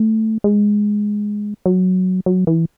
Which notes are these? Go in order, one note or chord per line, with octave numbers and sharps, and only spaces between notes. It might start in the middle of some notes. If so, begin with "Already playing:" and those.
Already playing: A3
G#3
F#3
F#3
E3